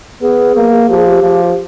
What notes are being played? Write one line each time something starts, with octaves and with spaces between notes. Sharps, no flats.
B3 G#4
A#3
F3 G4
G#4
G4
F3